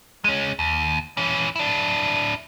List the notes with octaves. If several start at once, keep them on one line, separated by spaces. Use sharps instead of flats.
G#3 C#4
D#2
E3 C#4
D4 E4